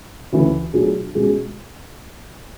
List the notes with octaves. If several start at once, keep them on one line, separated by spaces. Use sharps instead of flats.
D2 C#3 E3
B2 F#3 A3 D4 G#4
B2 G#3 C#4 G#4